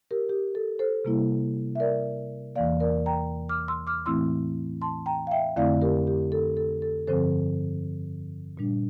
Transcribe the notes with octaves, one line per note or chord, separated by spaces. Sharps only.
G4 A#4
G4
A4
A4 C5
C3 G3 A#3 E4
E5
A#4 D5
E2 E3 A#3 D5 F5
A#4 D5
G5 A#5
D6 F6
C6 E6
D6 F6
A2 E3 A3 C4 E4 C6 E6
A5 C6
G5 A#5
F5
E5 G5
F2 D3 A3 C4 E4 D5 F5
G4 A#4
G4
A4
A4
A4
G2 D3 F3 C4 A4 C5
A#2 G3 D4